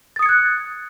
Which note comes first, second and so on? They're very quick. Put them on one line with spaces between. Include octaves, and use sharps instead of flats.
A6 D#6 C#7 G#6 F#6